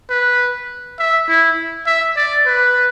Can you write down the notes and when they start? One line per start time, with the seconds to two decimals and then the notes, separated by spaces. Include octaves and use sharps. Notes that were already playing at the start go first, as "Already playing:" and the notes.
0.10 B4
0.99 E5
1.28 E4
1.86 E5
2.16 D5
2.46 B4